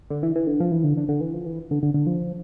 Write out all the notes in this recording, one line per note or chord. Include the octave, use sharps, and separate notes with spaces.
D3
E3
E3
D3
F3
E3
D3
D3
D3
E3
F3
E3
D3
D3
D3
F3